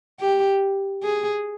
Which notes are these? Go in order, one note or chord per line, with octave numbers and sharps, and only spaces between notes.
G4
G#4